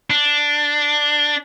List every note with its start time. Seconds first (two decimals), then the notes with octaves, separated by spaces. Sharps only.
0.10 D4